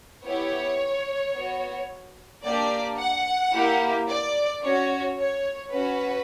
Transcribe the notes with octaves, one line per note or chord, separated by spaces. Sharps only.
B3 E4 G4 C#5
B3 F#4
A#3 D4 G4 D5
F#5
A#3 E4 G4
D5
C#4 F#4 C#5
C#5
C#4 F#4 B4